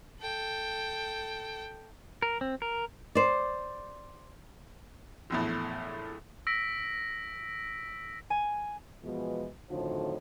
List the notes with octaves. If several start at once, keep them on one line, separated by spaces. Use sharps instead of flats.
A4 G5
A#4
C4
A#4
C5 D5
A#1 E2 A2
E6 A#6 B6 D7
G#5
B2 E3 F3 G#3 B3
F2 A2 D3 D#3 F3 F#3